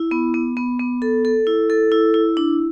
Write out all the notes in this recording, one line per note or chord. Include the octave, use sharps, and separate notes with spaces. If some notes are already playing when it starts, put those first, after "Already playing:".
Already playing: E4
B3
B3
B3
B3
A4
A4
E4
A4
E4
E4
D4